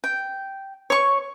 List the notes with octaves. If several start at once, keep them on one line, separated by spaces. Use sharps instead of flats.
G5
C#5 C#6